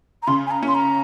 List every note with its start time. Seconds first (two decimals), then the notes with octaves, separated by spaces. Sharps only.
0.22 A#5
0.27 C#3 C6
0.46 G#5
0.51 A#5
0.63 C#4
0.68 C6
0.74 A#5